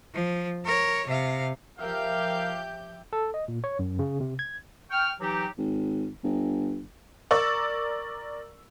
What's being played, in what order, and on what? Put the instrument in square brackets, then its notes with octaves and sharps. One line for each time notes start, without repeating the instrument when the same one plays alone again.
[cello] F3
A#4 C#5
C3 F5
[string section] F3 G4 G6 [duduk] A#4 [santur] E5 [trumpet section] F5
[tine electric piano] A4
D#5
A#2
C#5
F#2
C#3
C3
G#6
[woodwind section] G5 C#6 F6
E3 F#3 D#4 G4
[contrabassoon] G#1
G1
[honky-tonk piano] A#4 D5 C#6 E6